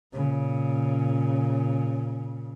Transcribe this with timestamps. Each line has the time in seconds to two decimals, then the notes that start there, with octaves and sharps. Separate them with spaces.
0.13 A#2 C#3